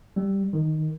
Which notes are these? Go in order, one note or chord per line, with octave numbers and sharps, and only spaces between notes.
G3
D#3